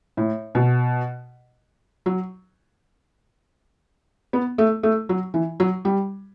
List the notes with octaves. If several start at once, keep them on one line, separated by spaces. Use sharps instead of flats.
A2
B2
F#3
B3
A3
A3
F#3
E3
F#3
G3